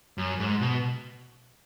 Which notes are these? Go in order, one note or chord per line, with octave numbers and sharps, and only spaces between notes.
F#2
G#2
B2